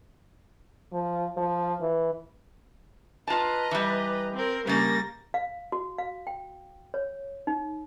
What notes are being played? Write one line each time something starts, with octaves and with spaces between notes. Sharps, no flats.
F3
F3
E3
F4 B4 D#5 A5 A#5
E3 G3
C4 A#4
C#3 G3 A#3 A6 A#6
F5
F#4
F5
G5
C#5
D#4